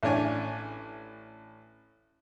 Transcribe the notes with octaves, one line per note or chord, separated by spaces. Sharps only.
A1 C#4 D4 C#5 G#5